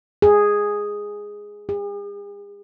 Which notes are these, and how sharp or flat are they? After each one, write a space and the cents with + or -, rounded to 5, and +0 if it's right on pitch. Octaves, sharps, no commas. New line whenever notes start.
G#4 -5
G#4 -45